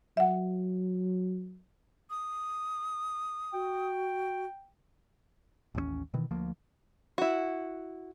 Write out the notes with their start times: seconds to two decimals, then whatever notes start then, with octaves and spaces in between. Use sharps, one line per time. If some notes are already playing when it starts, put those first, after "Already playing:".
0.17 F#3 E5 F#5
2.10 D#6
3.53 F#4 G5
5.75 A1 D#2 G#3 C#4
6.14 B2 D#3 E3
6.31 D2 F3 A#3
7.18 E4 F#4